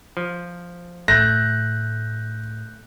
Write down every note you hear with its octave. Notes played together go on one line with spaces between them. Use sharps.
F3
A2 D3 A3 F#6 G6 A#6